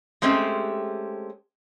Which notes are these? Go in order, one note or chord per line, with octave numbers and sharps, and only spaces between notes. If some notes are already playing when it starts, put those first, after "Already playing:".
G#3 A3 C4 C#4 G4